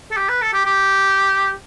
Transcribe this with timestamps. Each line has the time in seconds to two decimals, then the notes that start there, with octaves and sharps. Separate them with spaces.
0.11 A4
0.17 G4
0.29 B4
0.42 A4
0.53 G4
0.65 G4